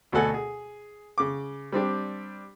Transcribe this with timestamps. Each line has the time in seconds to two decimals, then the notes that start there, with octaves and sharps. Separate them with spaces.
0.12 D2 B2 F#4 A4 F#5 G#5
0.34 G#4
1.18 C#3 D6
1.72 G3 C4 D4 G4